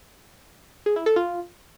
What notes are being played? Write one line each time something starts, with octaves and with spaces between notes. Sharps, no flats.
G#4
E4
A4
F4